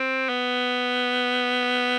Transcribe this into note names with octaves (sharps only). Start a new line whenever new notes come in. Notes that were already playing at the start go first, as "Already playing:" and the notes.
Already playing: C4
B3